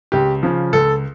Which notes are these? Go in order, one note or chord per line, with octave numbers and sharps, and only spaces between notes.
C#2 G4
C#3 F3
C#2 A4